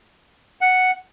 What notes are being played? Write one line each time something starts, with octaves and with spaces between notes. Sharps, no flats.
F#5